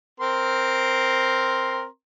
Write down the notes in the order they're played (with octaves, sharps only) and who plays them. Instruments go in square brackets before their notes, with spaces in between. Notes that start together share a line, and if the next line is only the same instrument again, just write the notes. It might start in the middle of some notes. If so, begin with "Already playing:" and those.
[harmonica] C4 A#4 C6